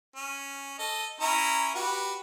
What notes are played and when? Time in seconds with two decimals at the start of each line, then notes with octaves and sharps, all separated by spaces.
0.16 C#4
0.79 A4 D#5
1.20 C#4 E4 A#5
1.75 F#4 G4 B4